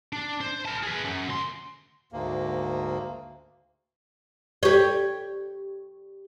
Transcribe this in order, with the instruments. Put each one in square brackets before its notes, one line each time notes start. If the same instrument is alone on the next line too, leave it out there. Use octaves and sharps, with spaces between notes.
[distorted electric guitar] D4
C5
A#4 A5
G#4 B4
F#2
D2 C6
[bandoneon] D2 G#2 A#3
[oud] G4 C#5